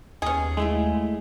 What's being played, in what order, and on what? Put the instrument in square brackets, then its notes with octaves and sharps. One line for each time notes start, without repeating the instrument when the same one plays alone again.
[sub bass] D#2 [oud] B3 D#4 [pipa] C#4 G#4
[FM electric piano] G#3 [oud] A3 E4 F4